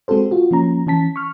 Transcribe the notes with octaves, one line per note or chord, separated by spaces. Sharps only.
G#3 C4 F#4 A4 C5
F4 F#4
F3 A#3 C#4 A#5
E3 C#4 A5 B6
C#6 F6